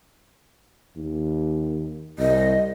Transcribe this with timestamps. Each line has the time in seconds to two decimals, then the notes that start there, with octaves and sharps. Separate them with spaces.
0.96 D#2
2.19 C2 D#5